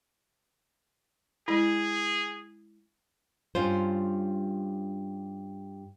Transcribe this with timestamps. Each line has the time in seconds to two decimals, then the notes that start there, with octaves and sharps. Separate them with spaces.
1.48 G#3 E4 G#4
3.55 G2 C#4 F4 C5